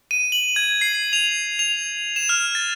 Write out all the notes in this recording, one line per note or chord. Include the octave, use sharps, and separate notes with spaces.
D#7
F#7
G#6
C7
F7
F7
E7
F6
A6